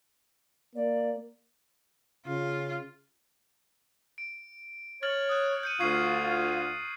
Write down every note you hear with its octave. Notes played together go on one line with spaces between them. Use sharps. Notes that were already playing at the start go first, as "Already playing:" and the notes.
A#3 D5
C#3 F4
D7
C#5 F6 A6 F#7
D#6 F#6
G6 C#7 D#7
D2 F4 C#6 G#6 C7